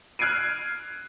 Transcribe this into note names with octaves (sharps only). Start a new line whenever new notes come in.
F6 F#6 G#6 C7 D7 D#7